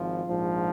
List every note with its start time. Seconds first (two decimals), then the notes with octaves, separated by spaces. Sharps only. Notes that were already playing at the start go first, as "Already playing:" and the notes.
Already playing: G#1 F3 F4
0.25 A#1 G#2 F3